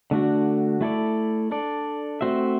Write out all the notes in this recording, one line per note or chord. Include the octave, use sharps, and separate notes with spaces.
D3 A3 D4 F#4
A3 E4 A4 D5
D4 A4 D5
A3 C4 F#4 C5 E5